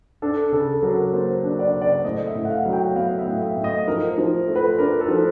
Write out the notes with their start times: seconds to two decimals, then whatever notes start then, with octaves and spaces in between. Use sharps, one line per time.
0.22 D4 A4
0.52 C#3 A4
0.83 F#3 A#4
1.13 A#3 C5
1.44 D4
1.59 D5
1.74 C#3
1.82 D5
2.04 A2 D#5
2.27 E5
2.35 A2
2.45 F#5
2.50 F5
2.65 F#3
2.73 G5
2.96 B3 F5
3.19 E5
3.26 A2
3.42 E5
3.56 A2
3.64 D#5
3.88 F3 A#4
4.18 F3
4.48 A3
4.56 B4
4.78 D4 A#4
5.01 A4
5.09 F3